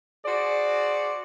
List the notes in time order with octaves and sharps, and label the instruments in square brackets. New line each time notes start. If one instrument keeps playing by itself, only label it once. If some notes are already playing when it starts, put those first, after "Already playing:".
[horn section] F#4 G#4 C5 D5